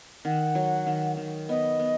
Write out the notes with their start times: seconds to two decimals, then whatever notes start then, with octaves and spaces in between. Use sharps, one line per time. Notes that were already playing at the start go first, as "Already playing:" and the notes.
0.25 D#3 F#5
0.55 F#3
0.86 D#3
1.17 D#3
1.48 B3 D#5
1.79 B3